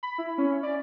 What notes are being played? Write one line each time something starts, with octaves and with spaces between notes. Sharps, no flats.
B5
E4
C#4
D5